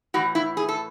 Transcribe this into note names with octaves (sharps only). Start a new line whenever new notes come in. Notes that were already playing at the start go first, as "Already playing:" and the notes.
A2 E3 F#4
E4
G#4
A4